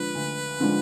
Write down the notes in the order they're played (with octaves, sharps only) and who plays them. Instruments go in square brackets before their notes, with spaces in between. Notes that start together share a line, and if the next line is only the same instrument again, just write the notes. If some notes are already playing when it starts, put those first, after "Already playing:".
Already playing: [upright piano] D3 F3 G#3 D4 [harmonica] B4
[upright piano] D2
D3 F3 G#3 D4